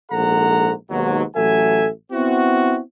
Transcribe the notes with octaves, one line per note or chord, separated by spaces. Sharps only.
A#1 G#2 A4 F#5 A#5
D#2 G#2 B2 F#3
A1 F#3 A4 E5 G#5
B3 C4 E4 F#4